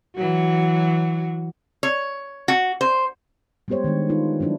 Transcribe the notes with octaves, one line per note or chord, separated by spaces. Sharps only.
E3 F#3 F#4
C#5
F#4
C5
G3 G#3 B3 G4 C5 C#5
D#3 G#3 D4
E3 D#4 F4 B4
F#3 G3 D4 E4